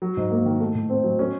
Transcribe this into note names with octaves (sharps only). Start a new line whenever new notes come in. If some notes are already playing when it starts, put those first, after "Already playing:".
F#3
G#2
A#3
D#3
A3
A2
C4
F#3
C#4